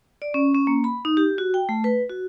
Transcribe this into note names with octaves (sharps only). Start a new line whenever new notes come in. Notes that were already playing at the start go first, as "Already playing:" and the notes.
D5
C#4
C#4
A#3
B5
D#4
G4
F#4
G5
A3
B4
F#4